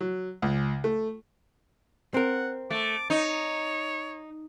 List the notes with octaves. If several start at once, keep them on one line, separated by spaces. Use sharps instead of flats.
F#3
C#2
A3
C4 A#4 F#5
A3 D6
D#4 C#5